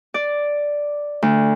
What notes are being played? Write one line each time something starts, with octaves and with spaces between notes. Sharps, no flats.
D5
D2